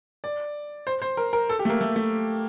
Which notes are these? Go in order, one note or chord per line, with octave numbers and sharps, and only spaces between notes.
D5
C5
C5
A#4
A#4
A4
G4
A3
A#3
A3
A3